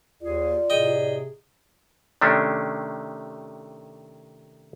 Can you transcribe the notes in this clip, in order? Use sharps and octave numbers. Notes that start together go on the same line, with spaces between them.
D#2 F4 G#4 D5
A2 C3 G#4 D#5 G5
C3 D#3 A3 C#4 D4